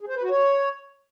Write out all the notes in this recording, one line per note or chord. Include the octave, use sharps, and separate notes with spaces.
G#4
C5
B4
F#4
C#5